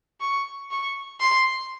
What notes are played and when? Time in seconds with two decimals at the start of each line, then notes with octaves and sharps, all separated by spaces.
0.20 C#6
0.71 C#6
1.20 C6